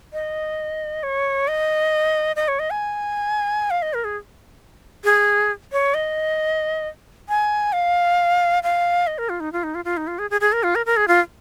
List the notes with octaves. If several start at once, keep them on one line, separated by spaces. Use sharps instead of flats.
D#5
C#5
D#5
D#5
C#5
D#5
G#5
F5
D#5
A#4
G#4
G#4
C#5
D#5
G#5
F5
F5
D#5
A#4
F4
D#4
F4
D#4
F4
F4
D#4
F4
G#4
G#4
G#4
A#4
F4
A#4
A#4
G#4
F4